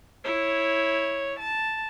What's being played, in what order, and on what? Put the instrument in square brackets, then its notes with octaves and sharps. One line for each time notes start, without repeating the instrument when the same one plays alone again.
[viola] E4 C#5
A5